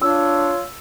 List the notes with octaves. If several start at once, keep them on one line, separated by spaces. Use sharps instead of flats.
D4 F4 C#5 E6